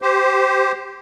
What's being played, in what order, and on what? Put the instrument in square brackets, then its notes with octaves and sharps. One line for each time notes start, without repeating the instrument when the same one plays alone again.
[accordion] G4 C5